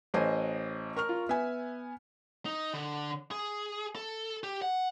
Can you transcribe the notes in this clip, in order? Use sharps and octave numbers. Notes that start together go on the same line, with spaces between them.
A1 B4 C5 D#5 G#5
A#4 C#6 F6
F4
B3 E5 G#5
D#4
D3
G#4
A4
G4
F#5